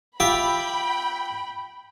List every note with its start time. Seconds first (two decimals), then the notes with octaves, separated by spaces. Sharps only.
0.20 F4 G4 E5 G5 B5